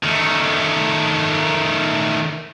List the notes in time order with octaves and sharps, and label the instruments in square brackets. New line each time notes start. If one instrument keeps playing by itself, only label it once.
[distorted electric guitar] D#3 A3